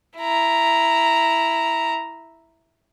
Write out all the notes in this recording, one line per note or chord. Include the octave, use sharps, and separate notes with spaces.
E4 A#5